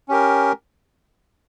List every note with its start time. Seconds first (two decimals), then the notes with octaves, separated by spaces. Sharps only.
0.09 C#4 G4 A#4